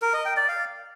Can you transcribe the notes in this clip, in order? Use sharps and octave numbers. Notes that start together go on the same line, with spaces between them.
A#4
D#5
G5
D5
F5